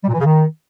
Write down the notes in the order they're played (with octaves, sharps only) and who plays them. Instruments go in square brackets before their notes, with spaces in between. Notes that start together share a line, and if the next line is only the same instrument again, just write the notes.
[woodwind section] G3
A#2
E3
C#3
D#3